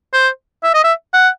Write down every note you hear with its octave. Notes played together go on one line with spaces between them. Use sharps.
C5
E5
D#5
E5
F#5